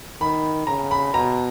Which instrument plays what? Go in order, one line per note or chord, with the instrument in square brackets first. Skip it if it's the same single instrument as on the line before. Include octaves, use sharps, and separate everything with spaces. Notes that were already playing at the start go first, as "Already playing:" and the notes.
[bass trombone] D#3 [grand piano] B5
[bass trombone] C#3 [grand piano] A#5
[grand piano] B5
[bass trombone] B2 [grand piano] A#5